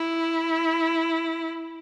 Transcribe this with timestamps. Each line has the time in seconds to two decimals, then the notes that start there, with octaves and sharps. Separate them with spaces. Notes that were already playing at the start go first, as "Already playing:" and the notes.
Already playing: E4